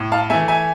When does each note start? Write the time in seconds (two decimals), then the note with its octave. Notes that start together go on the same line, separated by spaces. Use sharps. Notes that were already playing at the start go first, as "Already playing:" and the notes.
Already playing: A2
0.12 F5 A5
0.30 A3 E5 G#5
0.33 E3
0.48 E5 G#5